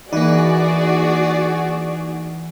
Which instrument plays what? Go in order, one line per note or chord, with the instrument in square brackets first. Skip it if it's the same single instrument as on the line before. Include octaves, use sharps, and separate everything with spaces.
[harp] E3 [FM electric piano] A#3 D#4 [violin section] F#4 G#4 D5